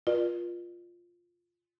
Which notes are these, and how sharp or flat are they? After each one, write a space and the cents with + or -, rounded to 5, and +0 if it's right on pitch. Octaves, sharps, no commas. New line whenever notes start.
F4 +0 B4 -45 D5 +40